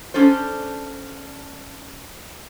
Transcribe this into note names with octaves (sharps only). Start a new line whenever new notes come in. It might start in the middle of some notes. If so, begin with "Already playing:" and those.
C#4 D4 A4 C5